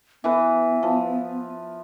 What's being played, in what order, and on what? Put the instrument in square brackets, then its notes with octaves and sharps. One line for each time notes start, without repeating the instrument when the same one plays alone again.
[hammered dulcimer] E3 B4 [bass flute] B3
[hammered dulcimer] F3